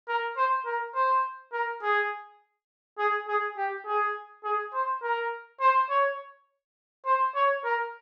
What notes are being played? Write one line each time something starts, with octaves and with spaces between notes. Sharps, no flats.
A#4
C5
A#4
C5
A#4
G#4
G#4
G#4
G4
G#4
G#4
C5
A#4
C5
C#5
C5
C#5
A#4